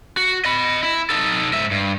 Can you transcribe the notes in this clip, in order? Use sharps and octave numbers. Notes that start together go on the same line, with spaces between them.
F#4
D#5 B5
E4
D#4 A4
G#2 E5
G2